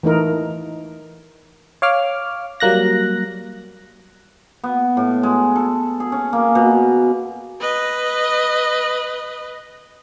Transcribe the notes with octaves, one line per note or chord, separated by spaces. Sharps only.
E3 A3 D#4 A#4
C#5 F5 D6 F6
F#3 G3 A#3 F#6 A#6
B3
A2
G#3
A4
G#4
C#4
A#3
B2
B4 D#5